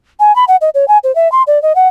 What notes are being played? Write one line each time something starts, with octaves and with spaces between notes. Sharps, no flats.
G#5
B5
F#5
D#5
C#5
G#5
C5
E5
C6
D5
D#5
F#5